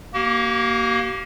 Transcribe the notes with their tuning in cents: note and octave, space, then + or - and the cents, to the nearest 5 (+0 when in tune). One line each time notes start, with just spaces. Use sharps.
A#3 +10 G4 -45